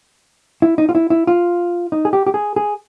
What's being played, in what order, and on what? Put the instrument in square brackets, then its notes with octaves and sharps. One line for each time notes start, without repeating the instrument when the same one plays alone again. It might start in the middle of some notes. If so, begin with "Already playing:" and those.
[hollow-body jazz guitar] E4
D#4
F4
E4
E4
F4
D#4
G#4
G4
G4
G#4
G#4